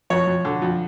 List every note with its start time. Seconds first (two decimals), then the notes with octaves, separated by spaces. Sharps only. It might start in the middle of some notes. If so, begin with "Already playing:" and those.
0.10 F2 C#5
0.27 F2
0.45 D3
0.62 F2